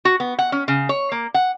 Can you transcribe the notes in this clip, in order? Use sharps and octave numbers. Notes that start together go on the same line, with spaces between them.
F#4
B3
F#5
C#4
C#3
C#5
A#3
F#5